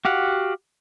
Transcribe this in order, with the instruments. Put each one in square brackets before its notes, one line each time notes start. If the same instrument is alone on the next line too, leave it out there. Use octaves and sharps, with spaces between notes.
[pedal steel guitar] F#4 G4 F5 F#5